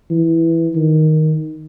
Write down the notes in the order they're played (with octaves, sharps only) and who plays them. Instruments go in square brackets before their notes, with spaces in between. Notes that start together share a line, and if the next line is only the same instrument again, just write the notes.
[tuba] E3
D#3